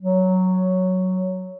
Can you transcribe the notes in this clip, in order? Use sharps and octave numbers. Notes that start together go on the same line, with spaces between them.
F#3